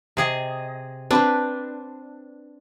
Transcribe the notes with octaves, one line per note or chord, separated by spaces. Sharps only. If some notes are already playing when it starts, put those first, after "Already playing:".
C3 G#4 D#5
C4 D4 B4 C5